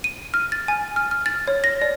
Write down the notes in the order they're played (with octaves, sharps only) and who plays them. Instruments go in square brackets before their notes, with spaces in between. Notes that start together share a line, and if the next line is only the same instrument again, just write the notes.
[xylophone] D#7
F6
A6
G#5
F6
F6
A6
C#5
A#6
D5